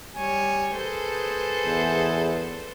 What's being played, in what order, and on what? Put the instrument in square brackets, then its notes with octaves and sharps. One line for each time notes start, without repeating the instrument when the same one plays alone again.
[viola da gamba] G3 C#5 [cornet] G#5
[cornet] G#4 [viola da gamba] A4 B4 C5
[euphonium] E2